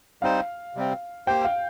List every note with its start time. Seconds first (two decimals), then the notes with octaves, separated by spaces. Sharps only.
0.22 G3 C4 D#4 C5 F5
0.75 C3 G3 C4
1.27 A#3 G4 C5 G5
1.45 F5